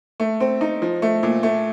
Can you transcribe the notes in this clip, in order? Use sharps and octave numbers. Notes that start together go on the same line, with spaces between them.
A3
C4
D#4
F3
A3
A#2
A3